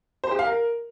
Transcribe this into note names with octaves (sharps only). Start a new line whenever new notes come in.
C5
G4
F5
A#4